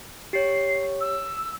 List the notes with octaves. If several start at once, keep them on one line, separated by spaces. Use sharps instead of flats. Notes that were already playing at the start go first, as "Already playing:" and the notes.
G4 C#5 C7
E6